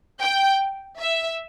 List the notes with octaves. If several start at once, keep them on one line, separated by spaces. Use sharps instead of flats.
G5
E5